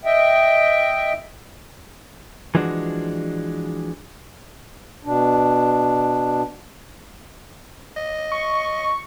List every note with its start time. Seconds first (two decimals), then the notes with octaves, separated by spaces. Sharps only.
0.05 D#5 E5 G5
2.55 E3 F3 G#3 D4 F#4
5.05 B2 D4
7.97 D#5
8.32 C#6